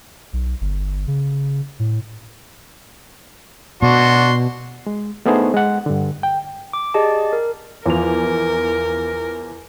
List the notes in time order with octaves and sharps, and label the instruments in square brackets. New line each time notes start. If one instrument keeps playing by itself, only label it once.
[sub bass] B1
G1
C#3
A2
[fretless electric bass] B2 [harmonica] D4 F#4 [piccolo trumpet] C6
[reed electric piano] G#3
A3 B3 D4 D#4 G#4 C5
G#3 F#5
G2 D3
G5
[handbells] D6
G4 G#4 D5 D#5 A5
A#4
[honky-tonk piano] E2 F3 F7 [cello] A#4